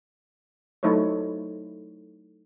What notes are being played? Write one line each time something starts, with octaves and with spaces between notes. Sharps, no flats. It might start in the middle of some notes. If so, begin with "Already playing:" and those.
F#3 A3 D#4 E4 C5 C#5